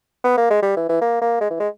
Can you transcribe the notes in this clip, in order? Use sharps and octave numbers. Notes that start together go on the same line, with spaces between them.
B3
A#3
G#3
G3
E3
E3
A#3
A#3
G#3
E3
G#3